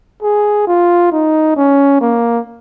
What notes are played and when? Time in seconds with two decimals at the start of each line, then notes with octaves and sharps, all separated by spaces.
0.22 G#4
0.67 F4
1.12 D#4
1.56 C#4
2.01 A#3